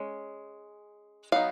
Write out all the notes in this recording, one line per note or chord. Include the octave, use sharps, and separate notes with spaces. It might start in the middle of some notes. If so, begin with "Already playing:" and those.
Already playing: G#3 C#4
F#3 B3 D#4 F5